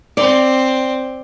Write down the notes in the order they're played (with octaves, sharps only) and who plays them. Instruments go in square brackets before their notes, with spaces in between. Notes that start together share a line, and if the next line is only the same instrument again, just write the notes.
[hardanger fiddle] C4 [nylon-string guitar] D5